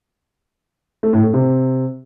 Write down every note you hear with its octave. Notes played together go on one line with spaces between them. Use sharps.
A3
A2
A3
C3